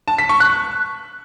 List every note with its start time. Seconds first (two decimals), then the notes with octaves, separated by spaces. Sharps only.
0.08 A5
0.18 B6
0.29 C#6
0.40 F#6